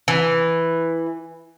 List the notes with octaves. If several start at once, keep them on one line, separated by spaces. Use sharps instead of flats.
E3